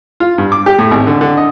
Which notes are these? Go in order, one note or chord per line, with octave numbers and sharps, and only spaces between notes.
F4
G2
D6
G4
A2
G#1
D3
D3
D#5